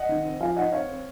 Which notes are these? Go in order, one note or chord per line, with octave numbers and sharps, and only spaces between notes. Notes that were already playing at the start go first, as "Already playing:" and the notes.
Already playing: D#5 F#5
D#3
C4
F3 F5 G#5
D#4 D#5 F#5
C4 C#5 F5
C4